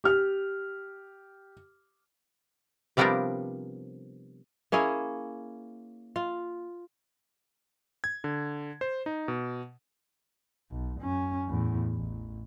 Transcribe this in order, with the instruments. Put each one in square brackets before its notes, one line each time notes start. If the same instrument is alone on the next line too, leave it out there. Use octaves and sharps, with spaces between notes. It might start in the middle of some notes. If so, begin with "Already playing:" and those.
[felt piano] G4 F6
[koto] C3 F3 G3 B3 D4 A#4
[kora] A#3 C#4 E4 G#4
F4
[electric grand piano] G#6
D3
C5
D#4
B2
[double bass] B1
F#2 C#4
E2 A2
A1